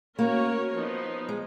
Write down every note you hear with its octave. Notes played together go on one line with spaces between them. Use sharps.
A#3 C#4 F#4 A#4 C#5
F3 B3 D#4
G#3